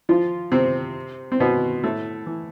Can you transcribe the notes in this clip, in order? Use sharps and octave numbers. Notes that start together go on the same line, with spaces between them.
F3 F4
C3 C4
C4
B2 B3
A2 A3
E3